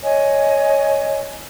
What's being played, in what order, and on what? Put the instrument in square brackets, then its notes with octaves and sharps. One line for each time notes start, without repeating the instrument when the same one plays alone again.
[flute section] C#5 D#5 G#5